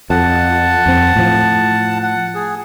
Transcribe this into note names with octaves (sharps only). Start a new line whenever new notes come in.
F2 F#5 A5
F2 C4
A2 F3
F#5
G#4